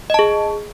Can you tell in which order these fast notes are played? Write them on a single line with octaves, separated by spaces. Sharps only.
D#5 A5 G#4